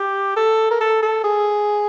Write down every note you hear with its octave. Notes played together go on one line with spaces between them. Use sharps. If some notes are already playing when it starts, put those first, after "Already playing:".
Already playing: G4
A4
A#4
A4
A4
G#4